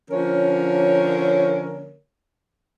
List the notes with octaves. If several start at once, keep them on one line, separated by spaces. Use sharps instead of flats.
D3 F3 A#3 C#4 A#4 C#5